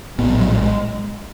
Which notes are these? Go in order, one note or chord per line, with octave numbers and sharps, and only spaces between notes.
A#1 A2 B3
F#3
F#3
G3
G#3